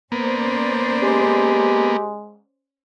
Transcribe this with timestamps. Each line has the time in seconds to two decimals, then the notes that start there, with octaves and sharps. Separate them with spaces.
0.12 A#3 B3 C#4 C5 D5
1.03 G#3 G4